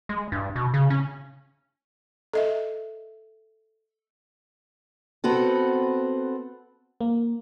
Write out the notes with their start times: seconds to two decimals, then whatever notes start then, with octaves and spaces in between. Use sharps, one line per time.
0.09 G#3
0.32 G2
0.56 B2
0.74 C#3
0.90 C#4
2.33 A4 D#5 E5
5.24 B3 C4 F#4 A4
7.01 A#3